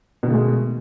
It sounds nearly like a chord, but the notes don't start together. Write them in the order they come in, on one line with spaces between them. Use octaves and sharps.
B2 D#3 A3 G#3